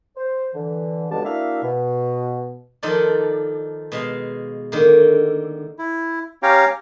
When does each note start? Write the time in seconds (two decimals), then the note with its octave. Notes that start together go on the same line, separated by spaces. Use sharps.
0.17 C5
0.54 D3 E3
1.10 C#2 B2 D3 G#3 G4 A5
1.25 A#3 D4 E4 F#4 E5 F5
1.63 B2
2.83 D#3 F3 D#4 F4 A4 D5
3.92 B2 G#3 F5
4.72 D3 D#3 A#3
5.79 E4
6.43 C#4 G4 C#5 F5 G5 A#5